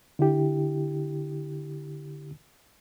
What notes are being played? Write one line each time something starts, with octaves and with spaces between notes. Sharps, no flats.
D3 E4 G4